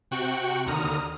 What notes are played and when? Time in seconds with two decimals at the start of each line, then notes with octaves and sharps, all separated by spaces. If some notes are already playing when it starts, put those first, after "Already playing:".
0.11 C3 F#4 G5 C#6 F#6 C#7
0.66 D#2 D3 A#5 D#6 F6